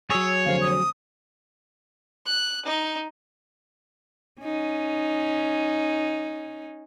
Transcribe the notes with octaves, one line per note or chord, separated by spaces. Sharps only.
F#3 G#4 C#5 E6
F1 D3 C5 F5
D#6
F#6
D#4
C#4 D#4